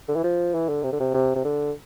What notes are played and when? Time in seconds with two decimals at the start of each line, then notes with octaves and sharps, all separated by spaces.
0.08 D3
0.16 E3
0.24 F3
0.54 E3
0.69 D3
0.83 C3
0.92 D3
1.00 C3
1.14 C3
1.36 C3
1.44 D3